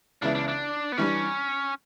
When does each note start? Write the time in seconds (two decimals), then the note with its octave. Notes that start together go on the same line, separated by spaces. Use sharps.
0.22 C#2 C#3 E3 B3 D4 E4
0.35 D4
0.48 D4
0.92 B3
0.98 E3 G3 C#4 D4